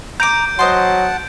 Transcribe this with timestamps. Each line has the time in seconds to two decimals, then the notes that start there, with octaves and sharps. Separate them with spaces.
0.20 A#5 D6 G6 D7
0.59 F#3 C5 D#5 F#5 A5 C6